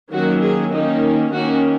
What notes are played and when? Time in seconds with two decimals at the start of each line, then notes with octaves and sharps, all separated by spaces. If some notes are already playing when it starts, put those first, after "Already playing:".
0.12 D#3 F#3 A#3 C#4 F#4
0.42 G#4
0.71 D#3 A#3 C#4 D#4
1.32 D#3 A#3 C#4 F#4